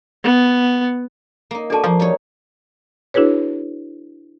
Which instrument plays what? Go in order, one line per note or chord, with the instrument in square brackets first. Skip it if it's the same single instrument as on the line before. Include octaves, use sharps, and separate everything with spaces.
[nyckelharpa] B3
[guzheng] A#3 D#4
[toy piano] D4 A4 A5 [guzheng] F#4 D5
[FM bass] F3 [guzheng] A#3
[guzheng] G3 D#4 C#5
[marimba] D4 E4 F#4 G#4 B4 C#5